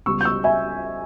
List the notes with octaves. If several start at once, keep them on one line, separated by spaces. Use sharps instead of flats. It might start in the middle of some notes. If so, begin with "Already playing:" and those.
C#2 C#3 G3 B3 C#6 E6
G6
C#6 E6
E5 G#5